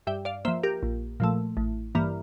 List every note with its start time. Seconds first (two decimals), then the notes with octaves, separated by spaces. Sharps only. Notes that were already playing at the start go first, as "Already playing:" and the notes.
0.07 G2 E5 G5
0.25 D5 F5
0.45 F3 A#3 C5 E5
0.63 G4 A#4
0.83 A#1
1.20 A#2 F3 A3
1.57 A1
1.95 G2 E3 A#3